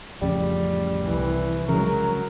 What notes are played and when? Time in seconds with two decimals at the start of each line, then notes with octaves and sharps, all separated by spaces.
0.22 A1 F2 C#3 G3
1.02 C2 E3
1.69 C#3 F#3 G#3 A#4